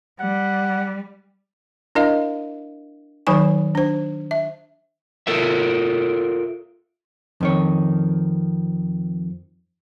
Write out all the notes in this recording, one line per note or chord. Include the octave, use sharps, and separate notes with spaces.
G3 F#5
D4 E4 A#4 D#5 F5
D#3 F#3 D#4 C5 G#5 C#6
D4 C5
E5
F4 A4 A#4 E5
F2 D#3 C#5